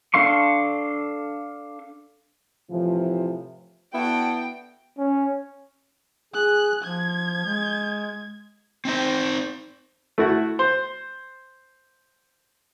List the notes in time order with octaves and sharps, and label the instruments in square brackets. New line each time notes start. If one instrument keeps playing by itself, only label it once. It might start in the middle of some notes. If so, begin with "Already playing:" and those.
[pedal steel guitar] D4 A4 F5 C6 C#6
[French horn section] A2 C3 E3 F3
[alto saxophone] B3 [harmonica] D4 F#4 A4 [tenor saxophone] E4 [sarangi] G5
[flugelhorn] C#4
[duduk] G#4 [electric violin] F#6
[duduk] F3 [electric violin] G#6
[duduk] G#3
[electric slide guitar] C4 D#4 C5
[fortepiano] A3 E4 F#4
C5